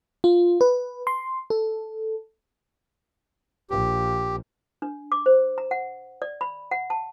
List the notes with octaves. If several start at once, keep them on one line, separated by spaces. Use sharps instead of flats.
F4
B4
C6
A4
A#1 G4
D4
D6
C5
A#5
F#5
D5
B5
F#5
A5